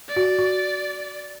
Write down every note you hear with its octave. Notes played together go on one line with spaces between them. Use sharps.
D5
F#4
F#4